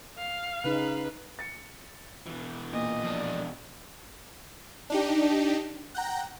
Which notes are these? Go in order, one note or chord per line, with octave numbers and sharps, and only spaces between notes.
F5
C#3 D#4 G#4 B4
A6 C#7
B2 E3
A#2 D#5
F2 D4
D4 D#4 G4
F#5 G5 A#5